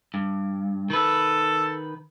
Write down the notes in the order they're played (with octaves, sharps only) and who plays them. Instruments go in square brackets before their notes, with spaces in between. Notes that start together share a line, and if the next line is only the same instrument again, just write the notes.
[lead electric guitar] G2
[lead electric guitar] D#3 B4 [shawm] A4